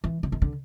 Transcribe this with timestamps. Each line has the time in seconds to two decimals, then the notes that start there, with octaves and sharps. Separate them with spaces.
0.04 E3
0.23 D3
0.32 D#3
0.42 D3